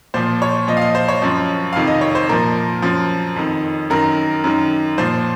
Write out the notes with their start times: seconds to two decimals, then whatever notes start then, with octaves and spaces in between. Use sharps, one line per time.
0.14 A#2 F3 C5
0.42 C#5
0.68 A#2 F3 D#5
0.77 F5
0.82 D#5
0.95 C5
1.08 C#5
1.22 F#2 F3
1.73 F2 C3 D#3 F5
1.87 D#5
2.01 C#5
2.15 C5
2.29 A#2 F3 A#4
2.82 F#2 F3
3.36 F2 D#3
3.90 F#2 D#3 A#4
4.44 F#2 D#3
4.98 A#2 F3 C5